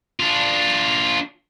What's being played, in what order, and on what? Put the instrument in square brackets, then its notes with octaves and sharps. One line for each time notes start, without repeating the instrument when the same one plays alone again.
[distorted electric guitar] D4 F4